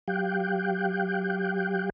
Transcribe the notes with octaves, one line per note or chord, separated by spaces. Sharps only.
F#3 G4 F5 G5 F#6 G6